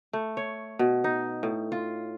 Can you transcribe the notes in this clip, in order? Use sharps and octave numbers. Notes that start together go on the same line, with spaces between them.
A3
C#5
B2
D#4
A2
F4